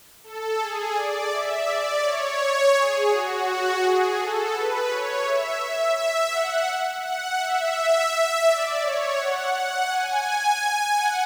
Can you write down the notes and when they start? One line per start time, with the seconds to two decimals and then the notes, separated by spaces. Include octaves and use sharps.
0.24 A4
0.59 G#4
0.95 D5
1.31 E5
1.66 D5
2.02 C#5
2.74 G#4
3.10 F#4
3.81 G#4
4.16 A4
4.53 B4
4.88 C#5
5.24 E5
5.60 E5
5.95 E5
6.31 F#5
7.02 F#5
7.38 E5
8.45 D5
8.81 C#5
9.17 F#5
9.53 F#5
9.88 G#5
10.96 F#5